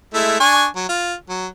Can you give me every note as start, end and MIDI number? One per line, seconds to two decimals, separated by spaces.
0.14 0.38 56
0.14 0.38 57
0.14 0.38 64
0.40 0.66 62
0.40 0.66 80
0.40 0.66 85
0.76 0.87 54
0.89 1.14 65
1.29 1.47 54